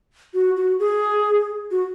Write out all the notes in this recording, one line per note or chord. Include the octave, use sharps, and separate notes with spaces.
F#4
F#4
G#4
F#4